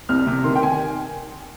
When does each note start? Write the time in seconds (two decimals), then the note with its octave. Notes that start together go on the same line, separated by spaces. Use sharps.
0.09 C2 F6
0.27 C3
0.44 D#3 C6
0.55 G5
0.63 G#5